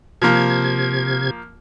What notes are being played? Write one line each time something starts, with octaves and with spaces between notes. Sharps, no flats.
C3 F3 A#3 G#6